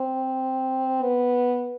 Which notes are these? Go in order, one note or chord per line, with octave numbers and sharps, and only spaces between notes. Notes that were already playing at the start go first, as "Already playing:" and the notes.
Already playing: C4
B3